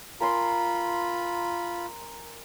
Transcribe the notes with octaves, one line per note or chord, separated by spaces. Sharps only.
F4 A#4 G#5 B5 C6